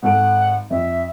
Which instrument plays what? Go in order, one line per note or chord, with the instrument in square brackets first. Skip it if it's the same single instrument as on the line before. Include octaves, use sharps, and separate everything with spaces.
[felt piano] G#1 A4 D7 [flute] F#5
[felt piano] F2 [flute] E5